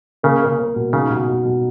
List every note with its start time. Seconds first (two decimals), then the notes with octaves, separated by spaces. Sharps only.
0.23 C#3 A#3
0.42 A#3
0.59 A#3
0.76 B2
0.93 C#3 D#4
1.10 B2
1.29 B2
1.45 B2